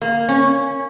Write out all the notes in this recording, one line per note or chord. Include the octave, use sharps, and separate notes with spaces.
A#3
C#4